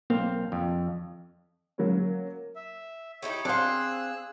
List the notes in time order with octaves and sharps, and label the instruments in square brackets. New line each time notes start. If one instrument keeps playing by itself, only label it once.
[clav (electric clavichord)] B1 C4 F5 [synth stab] A#3
[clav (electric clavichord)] F2
[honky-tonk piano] F#3 A#3 C#4
[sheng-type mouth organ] E5
[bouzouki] D#4 E4 G4 [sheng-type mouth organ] C#5
[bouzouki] C4 F5 [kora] D4 C5 [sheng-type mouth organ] G#4 E6 F#6